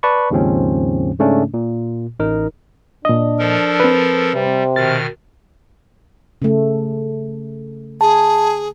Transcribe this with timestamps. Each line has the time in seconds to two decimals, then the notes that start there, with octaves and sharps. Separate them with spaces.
0.03 B4 D5 A5 B5 C#6
0.31 D#2 G#2 C#3 F3 C4 C#4
1.19 G#2 C#3 A3 C#4 D4
1.54 A#2
2.20 A1 D#4 A#4
3.05 A#2 D4 D#5
3.39 F3 A4 A#4
3.80 C4 B4
4.34 C3 G3
4.76 B2 D#3 F6 A6
6.42 C#3 A3
8.01 G#4 A5